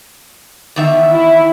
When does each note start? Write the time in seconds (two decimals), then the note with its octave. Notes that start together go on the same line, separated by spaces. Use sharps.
0.76 E2 D#3 E5
1.12 E4